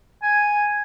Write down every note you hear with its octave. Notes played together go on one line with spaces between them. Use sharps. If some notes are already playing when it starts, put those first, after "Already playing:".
G#5